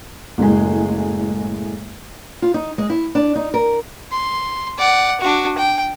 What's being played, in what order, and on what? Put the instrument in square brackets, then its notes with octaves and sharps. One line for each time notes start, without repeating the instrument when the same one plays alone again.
[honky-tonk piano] F#1 A2 G#3
[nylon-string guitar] F4
D#4
G#3
E4
D4
D#4
A#4
[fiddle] C6
D5 F#5
D4 F#4
G5